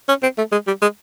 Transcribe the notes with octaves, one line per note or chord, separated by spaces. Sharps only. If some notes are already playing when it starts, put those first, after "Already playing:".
C#4
C4
A3
G#3
G3
G#3